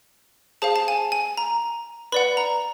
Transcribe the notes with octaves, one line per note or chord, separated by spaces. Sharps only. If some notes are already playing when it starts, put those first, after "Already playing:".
G#4 C5 F5 A5
A5
G#5
G#5
A#5
B4 D5 F#5 B5
A#5